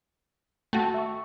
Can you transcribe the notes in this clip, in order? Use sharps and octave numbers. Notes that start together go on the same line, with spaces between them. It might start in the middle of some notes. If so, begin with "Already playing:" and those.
A3 F#4 G5 A5
E5 C#6